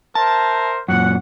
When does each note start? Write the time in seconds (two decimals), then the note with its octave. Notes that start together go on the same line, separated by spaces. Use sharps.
0.15 A#4 C5 E5 A5
0.88 F#2 A#2 F#5